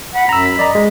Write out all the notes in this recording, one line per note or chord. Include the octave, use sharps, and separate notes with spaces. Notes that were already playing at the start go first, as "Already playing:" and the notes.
F#5 B5
F#2 A#5 E6
B6
D5 D#5 A#5
G#3